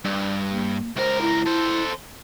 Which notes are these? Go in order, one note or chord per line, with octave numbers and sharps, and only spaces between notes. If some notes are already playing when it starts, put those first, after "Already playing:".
G2
A#3
C#2 A#4 C5
E4
A4 C5